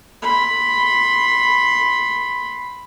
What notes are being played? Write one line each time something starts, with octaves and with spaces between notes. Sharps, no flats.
B5 C6